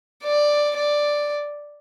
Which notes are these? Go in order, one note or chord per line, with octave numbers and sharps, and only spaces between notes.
D5
D5